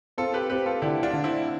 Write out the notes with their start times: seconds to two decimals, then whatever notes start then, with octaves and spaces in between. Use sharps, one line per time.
0.18 C4 F4 A4
0.34 G4 B4
0.50 C4 G4 B4
0.66 F4 A4
0.82 D3 E4 G4
1.03 D4 F4
1.13 D3
1.24 C4 E4